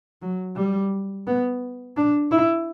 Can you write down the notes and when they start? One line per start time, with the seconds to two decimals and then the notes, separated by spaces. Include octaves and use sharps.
0.22 F#3
0.56 G3
1.27 B3
1.97 D4
2.31 E4